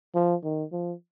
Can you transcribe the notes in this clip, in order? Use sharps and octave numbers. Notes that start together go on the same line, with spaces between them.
F3
D#3
F3